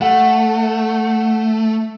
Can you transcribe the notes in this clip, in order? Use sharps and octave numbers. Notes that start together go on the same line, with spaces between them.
A3 F#5